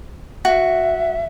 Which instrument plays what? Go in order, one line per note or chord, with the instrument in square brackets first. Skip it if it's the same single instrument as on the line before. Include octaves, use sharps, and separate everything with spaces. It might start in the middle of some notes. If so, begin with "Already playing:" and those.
[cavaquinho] F#4 [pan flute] E5